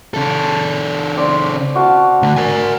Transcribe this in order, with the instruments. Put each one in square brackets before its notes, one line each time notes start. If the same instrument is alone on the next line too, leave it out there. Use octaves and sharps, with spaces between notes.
[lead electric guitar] C#3 A4
[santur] C4 D5
F#4 F5 A5
[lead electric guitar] D3 A3 [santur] A#5
[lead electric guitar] A#4 G#5